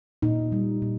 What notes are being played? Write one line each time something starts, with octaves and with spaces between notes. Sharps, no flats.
A#2 D#4
G3
A#2